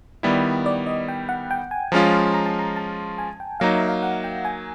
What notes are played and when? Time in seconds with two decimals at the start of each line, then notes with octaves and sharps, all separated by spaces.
0.23 D#3 G3 B3 E4 D5
0.66 D5
0.87 D#5
1.08 G5
1.29 F#5
1.51 G5
1.71 G#5
1.92 F3 G#3 C#4 F4 A#5
2.34 A#5
2.46 A5
2.59 A#5
2.76 A5
3.18 G#5
3.40 G5
3.60 F#3 A#3 D#4 F5
3.75 E5
3.88 F5
4.03 F#5
4.24 G5
4.45 G#5